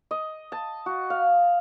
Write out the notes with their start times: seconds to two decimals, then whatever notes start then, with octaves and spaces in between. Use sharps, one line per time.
0.11 D#5
0.52 A5
0.86 F#4
1.10 F5